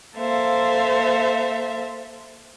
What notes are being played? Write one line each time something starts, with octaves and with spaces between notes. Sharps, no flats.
A#3 A4 C5 E5 F5